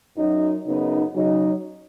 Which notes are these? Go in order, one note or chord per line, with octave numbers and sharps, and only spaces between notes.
F#2 F#3 D#4
F#2 C#3 B3 D#4
C#3 F#3 D#4